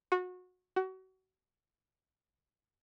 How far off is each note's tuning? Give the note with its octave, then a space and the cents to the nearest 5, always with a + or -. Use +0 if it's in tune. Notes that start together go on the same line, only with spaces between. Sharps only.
F#4 -25
F#4 +30